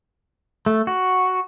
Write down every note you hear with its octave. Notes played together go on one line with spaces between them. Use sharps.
A3
F#4